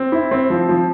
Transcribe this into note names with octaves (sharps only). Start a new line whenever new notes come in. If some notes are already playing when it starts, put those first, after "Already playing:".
Already playing: C4
E4
C4
F3
F3